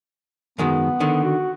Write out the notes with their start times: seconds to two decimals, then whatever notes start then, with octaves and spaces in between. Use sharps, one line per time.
0.59 F#2 D#3 G#3 B3
1.00 D3 D#3
1.24 F#4